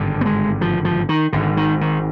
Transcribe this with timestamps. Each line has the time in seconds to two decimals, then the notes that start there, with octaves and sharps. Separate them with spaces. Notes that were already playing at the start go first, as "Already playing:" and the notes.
Already playing: G#1 G2 D3
0.21 B3
0.26 G#3
0.61 F3
0.85 F3
1.09 D#3
1.33 G#1 G#2 D3
1.57 D#3
1.81 D#3